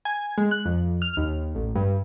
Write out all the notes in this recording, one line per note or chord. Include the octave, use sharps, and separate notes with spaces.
G#5
G#3
F#6
F2
F6
D#2
A1
G2